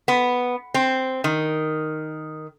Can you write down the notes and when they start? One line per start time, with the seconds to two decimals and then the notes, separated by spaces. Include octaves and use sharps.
0.08 B3
0.74 C4
1.24 D#3